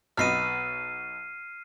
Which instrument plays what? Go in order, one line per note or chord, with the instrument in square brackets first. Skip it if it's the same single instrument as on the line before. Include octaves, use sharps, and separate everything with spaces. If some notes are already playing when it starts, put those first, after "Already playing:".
[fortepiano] B1 B3 D#5 [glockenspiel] F6 C7 D#7